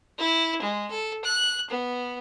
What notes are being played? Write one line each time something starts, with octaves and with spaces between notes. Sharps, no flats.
E4
G#3
A4
F#6
B3